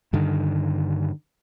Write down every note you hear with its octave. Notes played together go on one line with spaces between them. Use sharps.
G2 D3 D#3